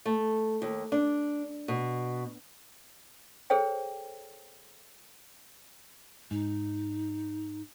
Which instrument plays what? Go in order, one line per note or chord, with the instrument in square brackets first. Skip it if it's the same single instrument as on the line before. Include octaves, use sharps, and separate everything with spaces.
[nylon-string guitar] A3
D#2
D4
B2
[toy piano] G#4 A4 C5 C#5 G5
[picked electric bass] G#2 [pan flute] D#4